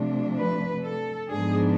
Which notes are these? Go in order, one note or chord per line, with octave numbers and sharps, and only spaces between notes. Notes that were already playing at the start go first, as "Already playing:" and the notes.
Already playing: C3 F3 A3 D4
B4
A4
G#2 F3 G#3 B3 D4 G#4